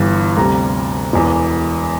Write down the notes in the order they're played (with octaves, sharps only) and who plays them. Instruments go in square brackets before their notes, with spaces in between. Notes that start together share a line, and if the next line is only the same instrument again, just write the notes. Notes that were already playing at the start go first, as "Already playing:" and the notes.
Already playing: [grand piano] G1 G2 E3
D2 C3 G3 A#5
E1 E2 E3